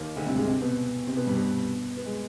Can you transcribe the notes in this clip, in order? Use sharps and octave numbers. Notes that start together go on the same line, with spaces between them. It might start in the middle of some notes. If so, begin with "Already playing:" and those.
Already playing: D#2 D#3
D2 D3
C2 C3
G#2 G#3
C3 C4
B2 B3
C3 C4
B2 B3
G2 G3
B2 B3
B3
G#3